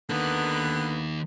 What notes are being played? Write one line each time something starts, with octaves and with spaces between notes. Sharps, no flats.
D3 D#3 A#3 B3